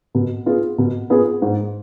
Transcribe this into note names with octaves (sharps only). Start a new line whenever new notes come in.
B2
B3 F4 G#4
B2
B3 F4 G#4
G#2